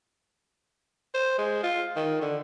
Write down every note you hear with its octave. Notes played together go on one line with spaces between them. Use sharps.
C5
G#3
F4
D#3
D3